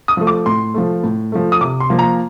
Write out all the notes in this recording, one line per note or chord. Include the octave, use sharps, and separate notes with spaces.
D#6
F3 A3
D6
A2 C6
F3 A3
A2
F3 A3
D#6
C3 D6
C6
F3 A#3
A#5